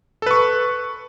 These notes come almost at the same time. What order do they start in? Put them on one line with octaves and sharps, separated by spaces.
A4 B4 C#6